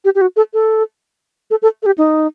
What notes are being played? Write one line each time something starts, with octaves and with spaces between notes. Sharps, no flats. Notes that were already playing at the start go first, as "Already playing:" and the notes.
G4
G4
F#4
A4
A4
A4
A4
A4
G4
D#4